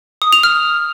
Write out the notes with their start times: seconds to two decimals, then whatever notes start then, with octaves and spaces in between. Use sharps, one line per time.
0.22 D#6
0.33 F7
0.43 F6